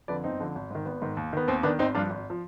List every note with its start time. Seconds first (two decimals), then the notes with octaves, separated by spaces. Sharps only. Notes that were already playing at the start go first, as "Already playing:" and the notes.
0.08 F2 D3 B4 D5
0.24 G1 C4 D#4
0.40 F2 D3
0.55 G#1
0.70 G#2 D#3
0.86 G#1 B3
1.02 G#2 D#3
1.17 D#2
1.33 D#3 B3
1.48 D#2 C4
1.63 D#3 B3 D4
1.79 G#1 C4 D#4
1.95 G2 F3 D4 F4
2.10 G#1
2.30 F3